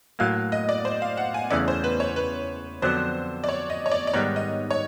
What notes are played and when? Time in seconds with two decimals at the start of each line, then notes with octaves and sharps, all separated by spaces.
0.19 A2 F#3 A#3 F5
0.52 D#5
0.69 D5
0.85 C5
1.02 F5
1.17 F#5
1.34 G#5
1.50 E2 C#3 E3 A3 C#4 D5
1.68 C5
1.84 B4
2.00 C#5
2.16 B4
2.82 F2 D3 F#3 B3 D4 C5
3.44 D5
3.49 C#5
3.70 D#5
3.86 C#5
3.92 D5
4.07 D5
4.14 G#2 D#3 G3 B3 D#4 C#5
4.36 D#5
4.71 C#5